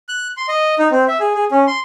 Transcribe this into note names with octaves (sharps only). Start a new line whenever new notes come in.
F#6
C6
D#5
D#4
C4
E5
G#4
G#4
C#4
C6